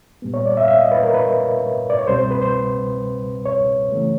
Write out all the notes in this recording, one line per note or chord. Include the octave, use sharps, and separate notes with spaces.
A#2 G3 B3
C#5
D5
E5
F5
E5
D#5
B4
A#4
B4
D5
C#5
C2 B2 G3 C4 C5
C5
B4
C5
C#5
C#3 E3 A3